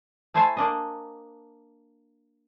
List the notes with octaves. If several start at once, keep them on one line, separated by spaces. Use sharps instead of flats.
A3 E4 A4 C5 G#5 A5
A#3 D4 D#5